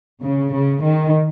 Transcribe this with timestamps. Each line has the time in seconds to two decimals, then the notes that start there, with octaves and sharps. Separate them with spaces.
0.23 C#3
0.54 C#3
0.83 D#3